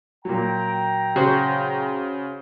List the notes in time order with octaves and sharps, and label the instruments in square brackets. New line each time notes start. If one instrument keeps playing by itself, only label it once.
[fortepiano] A#2 F#3 [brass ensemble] G5 A#5
[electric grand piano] C#3 [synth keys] F#4 C5